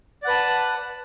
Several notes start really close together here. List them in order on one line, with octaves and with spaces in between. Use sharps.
D5 F#5 B4 A5